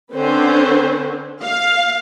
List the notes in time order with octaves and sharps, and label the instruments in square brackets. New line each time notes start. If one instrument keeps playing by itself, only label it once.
[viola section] D3 C4 C#4 B4 C5
F5